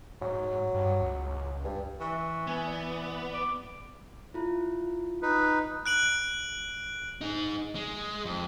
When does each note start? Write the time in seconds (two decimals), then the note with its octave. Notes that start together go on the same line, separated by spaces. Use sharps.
0.22 G#2 F#3
0.74 G2
1.01 C#2
1.64 G2
2.01 E3 C#6
2.47 B3 G#5
2.67 D5
3.34 D6
4.34 E4 F4
5.22 D#4 B4
5.86 F#6 D7 F#7
7.21 D#4 G#4
7.75 G#3
8.25 F2